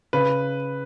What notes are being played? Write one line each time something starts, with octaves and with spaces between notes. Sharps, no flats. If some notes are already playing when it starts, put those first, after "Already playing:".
C#3 B4